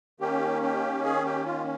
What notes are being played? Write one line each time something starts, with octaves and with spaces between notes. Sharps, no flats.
D#3 A#3 C#4 G4
G4
G#4
G4
F4